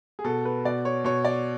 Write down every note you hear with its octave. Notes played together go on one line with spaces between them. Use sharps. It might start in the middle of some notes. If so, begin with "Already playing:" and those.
G#4
B2 A4
B4
B2 D5
C#5
B2 C#5
D5